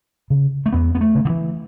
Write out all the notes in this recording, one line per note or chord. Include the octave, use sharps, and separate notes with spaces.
C#3
A3
E2 B3
B3
A3
C#3
D3
E3